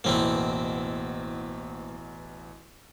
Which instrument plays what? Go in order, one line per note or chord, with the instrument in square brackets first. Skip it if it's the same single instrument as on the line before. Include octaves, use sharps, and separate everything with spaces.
[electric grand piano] A1 E2 B2 [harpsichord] A#3 C4 E4